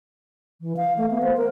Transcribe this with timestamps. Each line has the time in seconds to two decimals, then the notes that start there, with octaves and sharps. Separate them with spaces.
0.61 E3
0.77 F5
0.98 A3
1.11 B3
1.22 C5
1.37 A#4